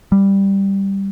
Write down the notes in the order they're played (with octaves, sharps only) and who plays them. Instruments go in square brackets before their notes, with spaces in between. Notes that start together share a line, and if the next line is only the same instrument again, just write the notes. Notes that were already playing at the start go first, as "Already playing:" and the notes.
[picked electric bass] G3